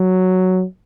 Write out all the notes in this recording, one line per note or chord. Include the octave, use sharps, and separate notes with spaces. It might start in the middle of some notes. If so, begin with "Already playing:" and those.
Already playing: F#3